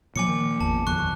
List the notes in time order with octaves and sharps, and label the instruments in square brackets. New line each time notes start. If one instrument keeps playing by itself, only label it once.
[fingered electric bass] A#2 F3 A#3 [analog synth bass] F#3 [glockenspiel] G#5 D6 C#7
[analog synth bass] D#3
[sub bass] G#1 [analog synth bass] E2 [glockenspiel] A5
[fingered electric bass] D#1 F2 D3 [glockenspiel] C#6 F#6